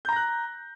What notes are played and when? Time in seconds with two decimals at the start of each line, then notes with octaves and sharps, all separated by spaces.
0.05 G6
0.09 A#5
0.12 A#6
0.16 F#6